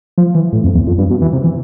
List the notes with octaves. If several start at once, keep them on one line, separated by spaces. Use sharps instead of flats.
F3
E3
A2
F2
E2
F2
G2
B2
E3
C3
E3